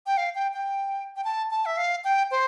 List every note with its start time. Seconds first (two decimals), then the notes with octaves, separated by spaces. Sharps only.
0.07 G5
0.17 F5
0.35 G5
0.54 G5
1.16 G5
1.24 A5
1.51 A5
1.66 E5
1.77 F5
2.04 G5
2.31 C5